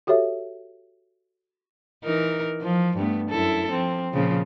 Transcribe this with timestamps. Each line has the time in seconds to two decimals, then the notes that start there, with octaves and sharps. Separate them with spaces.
0.07 F#4 G4 A4 C#5 E5
2.04 E3 D#4 A#4
2.62 F3
2.97 G2 A3 B3
3.30 F#2 E4 A4
3.70 F3 C4
4.12 A#2 C#3 F3